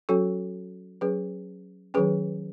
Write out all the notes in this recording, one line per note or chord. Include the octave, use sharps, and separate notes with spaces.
F#3 C#4 F#4 A4
F#3 C#4 G#4 B4
D#3 F#3 C#4 G#4 B4